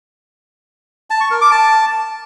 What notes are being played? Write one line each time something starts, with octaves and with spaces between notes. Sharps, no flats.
A5
C#6
A#4
D6
A5